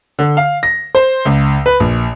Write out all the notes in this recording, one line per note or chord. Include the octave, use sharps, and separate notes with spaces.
D3
F5
A#6
C5
C#2
B4
A#1